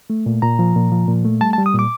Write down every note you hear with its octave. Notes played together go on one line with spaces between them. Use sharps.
A3
A#2
A#2 A#5
F3
A#2
F3
A#2
A3
G3 A5
A5
G3
D#6
A#2 D6